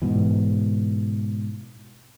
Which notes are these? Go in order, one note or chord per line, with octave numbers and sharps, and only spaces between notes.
G#2 B2 E3